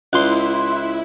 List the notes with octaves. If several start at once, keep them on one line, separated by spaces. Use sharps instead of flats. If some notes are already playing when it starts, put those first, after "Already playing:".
C#2 E4 C6 F#6